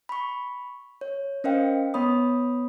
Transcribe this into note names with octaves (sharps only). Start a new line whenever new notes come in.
B5 C#6
C#5
C#4 A#4 C5 D#5 F5 G5
B3 C#5 B5 D#6